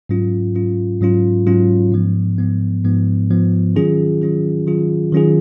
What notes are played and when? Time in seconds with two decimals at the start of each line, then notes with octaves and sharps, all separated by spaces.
0.09 G#2 F#3 C#4 F4
0.55 G#2 F#3 C#4 F4
1.01 G#2 F#3 C#4 F4
1.47 G#2 F#3 C#4 F4
1.92 G#2 F3 B3
2.39 G#2 F3 B3
2.84 G#2 F3 B3
3.30 G#2 F3 B3
3.76 D#3 F#3 C#4 F4 G#4
4.21 D#3 F#3 C#4 F4 G#4
4.67 D#3 F#3 C#4 F4 G#4
5.12 D#3 F#3 C#4 F4 G#4